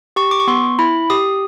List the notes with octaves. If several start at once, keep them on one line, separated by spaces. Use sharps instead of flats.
G4 C#6
D6
C#6
B3 C6
E4 B5
G4 D#6